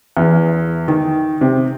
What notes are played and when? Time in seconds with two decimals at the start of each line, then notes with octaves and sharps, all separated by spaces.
0.17 E2
0.88 D#3
1.41 C3